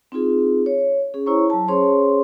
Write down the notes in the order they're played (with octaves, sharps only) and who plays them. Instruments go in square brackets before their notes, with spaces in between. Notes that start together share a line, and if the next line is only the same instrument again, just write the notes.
[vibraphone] C4 D#4 F4 G#4
C#5
C#4 G#4
E4 C5 C#5 A#5 C#6
F#3 A5
C#4 G#4 C5 C#5 C6